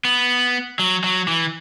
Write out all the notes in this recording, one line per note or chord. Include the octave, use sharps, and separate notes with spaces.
B3
F#3
F#3
E3